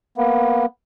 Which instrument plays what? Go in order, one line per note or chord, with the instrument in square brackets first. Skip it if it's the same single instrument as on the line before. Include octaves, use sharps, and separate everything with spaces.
[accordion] A#3 B3